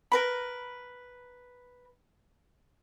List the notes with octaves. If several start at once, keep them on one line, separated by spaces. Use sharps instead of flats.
A#4 B4 B5